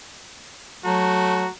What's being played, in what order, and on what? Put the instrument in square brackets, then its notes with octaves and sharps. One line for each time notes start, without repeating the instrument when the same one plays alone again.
[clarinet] F#3 [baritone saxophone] A3 [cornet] F#4 [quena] A#5